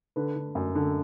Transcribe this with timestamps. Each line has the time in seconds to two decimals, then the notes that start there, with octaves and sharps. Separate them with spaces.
0.16 D3 B4
0.36 D3
0.55 F#2
0.75 D3